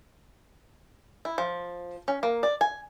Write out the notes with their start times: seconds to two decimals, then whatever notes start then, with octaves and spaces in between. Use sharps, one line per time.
1.25 E4
1.38 F3
2.08 C#4
2.23 A#3
2.43 D5
2.61 G#5